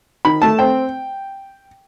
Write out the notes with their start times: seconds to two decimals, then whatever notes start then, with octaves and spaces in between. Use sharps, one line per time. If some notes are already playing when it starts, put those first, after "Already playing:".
0.25 D#3 B5
0.42 A3 A5
0.59 C4 G5